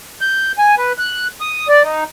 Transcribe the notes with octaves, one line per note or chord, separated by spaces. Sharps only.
G6
G#5
B4
F#6
D#6
D5
D#4